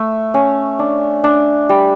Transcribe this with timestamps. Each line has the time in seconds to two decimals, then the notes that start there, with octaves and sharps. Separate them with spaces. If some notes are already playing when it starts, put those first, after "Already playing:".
Already playing: A3
0.34 C#4
0.79 D4
1.24 D4
1.69 G3